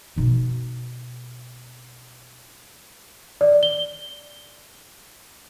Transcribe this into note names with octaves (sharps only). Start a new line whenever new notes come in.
B2 D#4
D5
G7